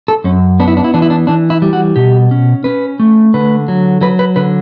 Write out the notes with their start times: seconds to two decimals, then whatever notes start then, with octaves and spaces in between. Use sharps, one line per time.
0.08 A4
0.24 F#2 C#4
0.60 B3 D4
0.68 E4
0.77 D4
0.84 E4
0.94 E3 D4
1.02 E4
1.10 D4
1.27 E3 D4
1.50 E4
1.62 G3
1.73 F#4
1.96 B2 G4
2.31 C#4
2.64 C#4 B4
3.00 A3
3.34 D3 B4
3.68 F#3
4.01 F#3 B4
4.19 B4
4.36 D3 B4